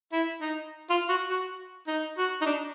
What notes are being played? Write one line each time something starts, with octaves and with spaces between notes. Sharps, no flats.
E4
D#4
F4
F#4
F#4
D#4
F#4
D#4
D4